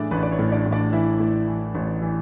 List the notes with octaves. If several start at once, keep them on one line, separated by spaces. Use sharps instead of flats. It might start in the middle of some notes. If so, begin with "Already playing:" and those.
Already playing: A2 E3 A3 D4 G#4 A4 D5 E5
A1 B4
D5
C#5
A2
D4 D5
A2
D4 D5
E3 E4 E5
A2
E3
A1
E3